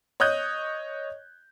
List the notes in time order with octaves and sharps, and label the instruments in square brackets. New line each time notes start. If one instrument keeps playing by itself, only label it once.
[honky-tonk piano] C#5 D#5 D#6 F#6 G6